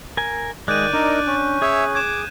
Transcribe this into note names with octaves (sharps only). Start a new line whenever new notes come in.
A#4 G#5
D#3 G#3 D5 F#6 G6 D#7
D4 D#4 A#4
C#4
G#4 C#5 E5
D6 G#6 E7